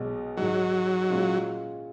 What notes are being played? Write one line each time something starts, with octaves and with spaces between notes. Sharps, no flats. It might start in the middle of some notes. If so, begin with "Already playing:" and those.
Already playing: B1 B2 G#3
G#2 D#3 F#3 G#3
A#2 G#3 C#4 F4